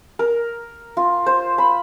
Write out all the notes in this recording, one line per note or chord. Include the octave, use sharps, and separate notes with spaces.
A#4
F4
C5
B5